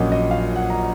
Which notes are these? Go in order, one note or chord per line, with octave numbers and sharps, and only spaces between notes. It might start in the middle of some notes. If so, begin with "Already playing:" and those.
Already playing: A#1 A#2 F#3 C#4 D#5 F#5 G#5
D#5
F5
F#5
A#5